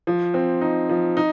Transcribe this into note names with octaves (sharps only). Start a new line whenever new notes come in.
F3
C4
D#4
F3
D#4